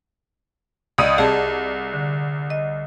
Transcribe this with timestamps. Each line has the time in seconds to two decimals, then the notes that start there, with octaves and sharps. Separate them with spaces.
0.98 C#2 D5 D#5 D#6 D#7
1.18 C2 G#4 A5
1.93 D3
2.50 D#5